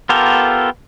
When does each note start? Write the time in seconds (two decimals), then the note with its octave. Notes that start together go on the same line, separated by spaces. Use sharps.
0.09 B3 F4 G4 A4 A#4